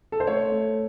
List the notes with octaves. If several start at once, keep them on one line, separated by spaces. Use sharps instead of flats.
A4
C5
A3 C#5
A3